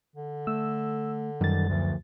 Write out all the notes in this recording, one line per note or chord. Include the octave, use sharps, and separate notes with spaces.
D3
A3 E6
F#2 D#3 G3 A6
D2 D3 D#3 F3